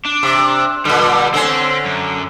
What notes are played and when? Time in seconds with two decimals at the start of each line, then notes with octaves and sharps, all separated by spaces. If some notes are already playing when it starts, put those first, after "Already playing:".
0.05 D4
0.23 C3
0.85 A#2 D3 G3
1.34 D3 C4 C#4
1.85 F#2